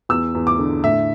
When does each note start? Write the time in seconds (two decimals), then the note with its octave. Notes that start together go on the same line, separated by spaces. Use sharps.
0.09 E2 E6
0.35 E2
0.47 D6
0.59 D3
0.84 A2 E5